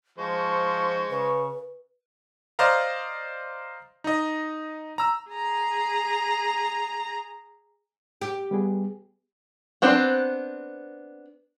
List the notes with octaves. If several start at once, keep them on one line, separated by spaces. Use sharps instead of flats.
F3 G#3 C5 C#6
C#3 B4
C5 D5 D#5 F5 A#5
D#4 D#5
A#5 E6
G#4 A#5
G4
G3 B3 G#4
B3 C4 D4 C5